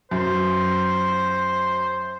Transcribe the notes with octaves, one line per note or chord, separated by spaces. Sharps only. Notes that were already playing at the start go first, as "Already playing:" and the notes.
F#2 C5